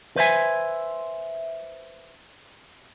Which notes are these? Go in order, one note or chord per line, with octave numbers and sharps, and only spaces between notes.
B4 C5 E5 G#5